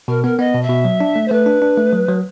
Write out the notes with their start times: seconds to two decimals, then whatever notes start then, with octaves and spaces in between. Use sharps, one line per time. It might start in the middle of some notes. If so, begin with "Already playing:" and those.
0.08 B2 A#4
0.23 B3 A#4
0.39 B3 D#5
0.54 B2
0.62 E5
0.69 B2
0.85 F#3
1.00 D4
1.16 A3
1.27 C5
1.31 A3 B4
1.46 D4
1.62 D4
1.78 A3
1.93 F#3
2.08 F#3